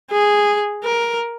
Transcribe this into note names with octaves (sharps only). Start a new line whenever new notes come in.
G#4
A#4